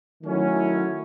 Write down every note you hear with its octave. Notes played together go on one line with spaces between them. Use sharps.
D#3 F#3 A3 C#4 E4